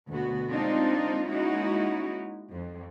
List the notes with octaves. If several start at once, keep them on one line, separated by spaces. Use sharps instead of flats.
D2 B2 B3 F#4
G#3 A#3 C4 D4 D#4 F4
G#3 A#3 C#4 D#4 E4 F#4
F2